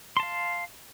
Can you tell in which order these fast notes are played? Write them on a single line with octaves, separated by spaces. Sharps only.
C6 A5 F5